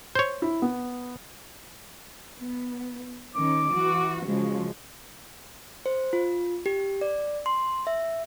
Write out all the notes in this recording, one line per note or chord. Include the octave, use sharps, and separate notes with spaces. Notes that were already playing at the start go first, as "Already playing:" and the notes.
C5 C#5
E4
B3
B3
D#3 C#4 D6
E3 F#4
C#3 F3 G#3 F#4
C5
F4
G4
D5
C6
E5